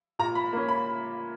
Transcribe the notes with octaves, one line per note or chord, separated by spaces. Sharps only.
A#2 A#5
B5
A#3 C#4
B5